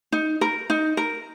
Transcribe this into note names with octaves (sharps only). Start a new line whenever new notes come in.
D#4
A#4
D#4
A#4